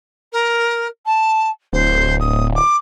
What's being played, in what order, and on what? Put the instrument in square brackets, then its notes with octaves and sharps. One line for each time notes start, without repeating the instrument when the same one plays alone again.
[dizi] A#4
A5
[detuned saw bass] D1 [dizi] C5
[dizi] D#6
D6